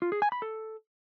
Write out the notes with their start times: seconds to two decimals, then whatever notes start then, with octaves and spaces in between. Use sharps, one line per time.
0.02 F4
0.12 G#4
0.22 G#5
0.32 B5
0.42 A4